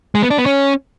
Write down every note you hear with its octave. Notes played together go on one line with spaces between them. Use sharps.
G#3
B3
D4
B3
C#4